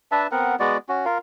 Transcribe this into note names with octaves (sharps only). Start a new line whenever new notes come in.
D4 B4 E5 A5
B3 C4 A#4 F#5
G#3 B3 F#4 D5
C#4 F#4
F4 A#4 F5